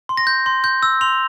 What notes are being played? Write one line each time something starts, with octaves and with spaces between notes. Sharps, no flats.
C6
A#6
G6
C6
G6
E6
C6 F7